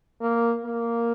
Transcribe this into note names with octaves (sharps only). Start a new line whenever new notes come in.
A#3
A#3